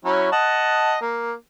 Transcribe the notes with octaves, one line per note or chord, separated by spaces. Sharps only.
F#3 C#4 E4
D#5 F#5 A5
A#3